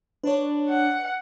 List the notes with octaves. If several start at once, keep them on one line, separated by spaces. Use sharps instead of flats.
D4 B4 C#5
F#5